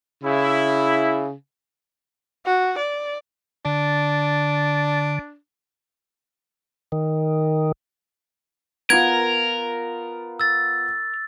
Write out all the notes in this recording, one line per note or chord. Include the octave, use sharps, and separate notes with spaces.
C#3 E4
F#4
D5
D3 D4
D#3
B3 F4 A#4 G#6
E6 A6